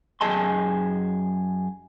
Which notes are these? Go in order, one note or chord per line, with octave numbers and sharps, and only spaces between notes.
F#2 G#4 D#5 A5 C6